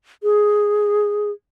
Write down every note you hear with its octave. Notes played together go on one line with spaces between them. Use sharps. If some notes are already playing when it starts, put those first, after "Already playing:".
G#4